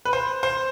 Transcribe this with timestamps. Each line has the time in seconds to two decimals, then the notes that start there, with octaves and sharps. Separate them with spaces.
0.05 B4
0.13 C5
0.43 C5